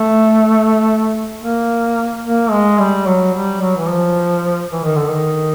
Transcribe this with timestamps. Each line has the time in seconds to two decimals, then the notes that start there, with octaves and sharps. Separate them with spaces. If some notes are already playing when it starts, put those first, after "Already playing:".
Already playing: A3
1.41 A#3
2.24 A#3
2.51 G#3
2.79 G3
3.06 F#3
3.34 G3
3.61 F#3
3.77 E3
3.89 F3
4.71 E3
4.83 D#3
4.96 D3
5.07 D#3